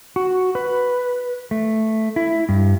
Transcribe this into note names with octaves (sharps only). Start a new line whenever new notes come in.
F#4
B4
A3
E4
G2